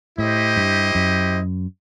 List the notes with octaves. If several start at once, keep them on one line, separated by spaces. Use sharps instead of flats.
A2 E4 G4 C5 D#5
G2
F#2